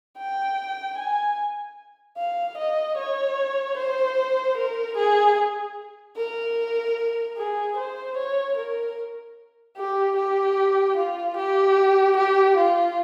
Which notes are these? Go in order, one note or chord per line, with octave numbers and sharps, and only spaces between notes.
G5
G#5
F5
D#5
C#5
C5
A#4
G#4
A#4
G#4
C5
C#5
A#4
G4
G4
F4
G4
G4
F4